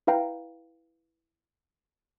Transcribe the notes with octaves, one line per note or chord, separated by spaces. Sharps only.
E4 B4 F5 G5 A#5